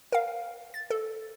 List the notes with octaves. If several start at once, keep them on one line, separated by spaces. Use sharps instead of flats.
A#4 F5
A6
A4